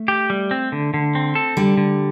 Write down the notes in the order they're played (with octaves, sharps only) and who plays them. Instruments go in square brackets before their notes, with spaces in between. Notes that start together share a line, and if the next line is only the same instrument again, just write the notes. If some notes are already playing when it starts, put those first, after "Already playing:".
Already playing: [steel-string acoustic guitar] A3
[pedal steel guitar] G4
G3
C4
D3
D3
C4
A4
[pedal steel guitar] D3 [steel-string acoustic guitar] G3
[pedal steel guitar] D3